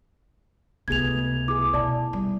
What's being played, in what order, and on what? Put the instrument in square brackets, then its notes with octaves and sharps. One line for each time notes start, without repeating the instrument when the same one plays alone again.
[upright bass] C#2 C3 [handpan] A3 B3 G#4 [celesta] G#6 F7
[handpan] E4 G#4 [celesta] D6
[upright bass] B2 [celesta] D5 A5
[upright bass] G3